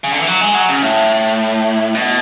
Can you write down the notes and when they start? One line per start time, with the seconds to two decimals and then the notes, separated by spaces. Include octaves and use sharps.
0.04 C#3
0.12 D3
0.19 E3
0.27 F#3
0.41 G#3
0.55 F#3
0.69 C#3
0.83 A2
1.95 B2